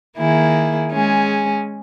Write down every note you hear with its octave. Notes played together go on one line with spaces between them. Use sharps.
D#3 A#3 E4 G#4
G#3 C#4 G#4